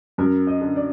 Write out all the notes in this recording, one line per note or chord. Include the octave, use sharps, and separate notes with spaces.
F#2 A#4
D#5
D3
D5